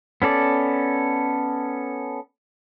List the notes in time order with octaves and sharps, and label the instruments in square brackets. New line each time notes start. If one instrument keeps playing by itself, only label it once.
[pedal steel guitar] B3 C#4 A4 D5